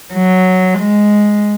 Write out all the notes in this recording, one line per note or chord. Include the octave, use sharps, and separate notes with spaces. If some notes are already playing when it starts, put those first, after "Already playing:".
F#3
G#3